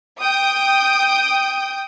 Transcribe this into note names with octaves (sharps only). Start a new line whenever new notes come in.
G5 D#6